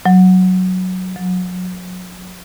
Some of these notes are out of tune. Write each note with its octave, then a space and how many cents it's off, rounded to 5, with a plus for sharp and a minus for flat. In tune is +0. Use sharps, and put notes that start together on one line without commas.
F#3 +0
F#3 -30